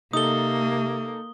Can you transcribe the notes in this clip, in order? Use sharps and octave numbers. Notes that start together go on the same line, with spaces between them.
C3 A#3 D#4 A4 D#6 G7